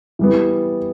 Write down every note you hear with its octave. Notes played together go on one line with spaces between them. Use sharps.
E3 G3 B3